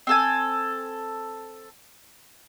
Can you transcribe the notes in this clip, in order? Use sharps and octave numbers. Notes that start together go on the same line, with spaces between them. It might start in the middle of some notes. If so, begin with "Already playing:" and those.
C4 A4 G#5